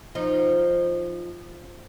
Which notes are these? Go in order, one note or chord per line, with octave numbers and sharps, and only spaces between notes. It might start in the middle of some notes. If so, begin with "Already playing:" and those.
F3 D#4